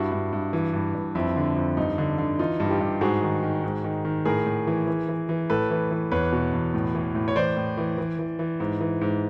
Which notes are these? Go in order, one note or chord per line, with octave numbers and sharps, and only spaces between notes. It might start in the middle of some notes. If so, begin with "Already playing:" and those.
Already playing: G2 E4 F#4
G2
G2
E3
G2
G2
F2 E4
D3
F2
G2 D#4
D3
D3
E3 D#4 F4
G2
F4 G4
G2
G#2 F#4 G#4
D#3
D#3
G#2
D#3
D#3
A2 G#4 A#4
A2
E3
E3
E3
E3
A2 A4 B4
E3
E3
E2 B4 C#5
B2
E2
A2
E3
A2
C#5
E3 C5 D5
A2
E3
E3
E3
E3
G#2
E3
G#2